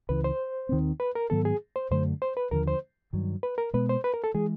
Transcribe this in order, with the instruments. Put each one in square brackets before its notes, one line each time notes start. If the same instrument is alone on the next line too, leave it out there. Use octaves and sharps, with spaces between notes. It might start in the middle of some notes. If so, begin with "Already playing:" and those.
[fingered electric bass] C#2 C#3 E3 [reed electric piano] B4
[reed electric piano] C5
[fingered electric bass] D#2 D#3 G3 C4
[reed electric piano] B4
A#4
[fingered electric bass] G#2 D#3 F#3 B3 [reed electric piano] A4
[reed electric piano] G#4
C5
[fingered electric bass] F#2 D3 F#3 A3 [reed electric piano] C5
[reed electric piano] C5
B4
[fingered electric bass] D#2 D3 F3 [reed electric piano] A#4
[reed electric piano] C5
[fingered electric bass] G2 D#3 F#3
[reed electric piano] B4
A#4
[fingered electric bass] B2 G#3 B3 [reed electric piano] B4
[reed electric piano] C5
B4
A#4
A4
[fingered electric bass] E3 G#3 [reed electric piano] G#4